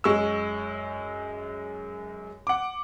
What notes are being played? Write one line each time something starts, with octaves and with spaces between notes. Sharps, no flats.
F#2 G#3 C#6 E6
F#5 D6